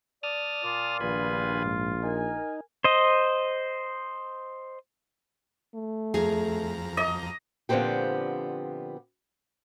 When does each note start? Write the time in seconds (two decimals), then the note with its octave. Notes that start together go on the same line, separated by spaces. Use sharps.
0.23 D5 A5 D#6 F6
0.64 A#2 F4 D6
1.00 A#1 G2 D#3 B3 G#5 B5
1.64 G#2
2.03 D#4 A#4 G#5
2.84 C5 D#5
5.75 A3
6.14 F2 F3 G#4 A#5
6.97 D#5
7.69 A#2 D3 F3 B3 C4 G4